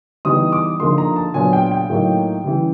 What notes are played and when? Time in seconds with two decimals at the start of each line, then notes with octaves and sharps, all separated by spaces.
0.25 E3 G3 B3 D#4 D#6
0.52 D6
0.80 D3 F3 A#3 D#4 C6
0.98 A#5
1.16 A5
1.34 A#2 F#3 B3 D4 G#5
1.53 G5
1.71 G5
1.90 A2 F#3 A#3 D#4
2.44 C#3 E3 G3